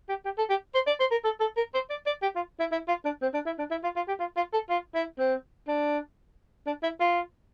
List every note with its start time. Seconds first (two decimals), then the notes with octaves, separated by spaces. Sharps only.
0.09 G4
0.25 G4
0.38 A4
0.50 G4
0.75 C5
0.87 D5
1.00 C5
1.11 A#4
1.24 A4
1.41 A4
1.57 A#4
1.74 C5
1.90 D5
2.06 D5
2.22 G4
2.36 F4
2.60 E4
2.72 E4
2.88 F4
3.05 D4
3.22 C4
3.34 D4
3.46 E4
3.59 D4
3.71 E4
3.83 F4
3.96 F4
4.08 G4
4.20 F4
4.37 F4
4.53 A4
4.69 F4
4.95 E4
5.19 C4
5.68 D4
6.67 D4
6.83 E4
7.00 F4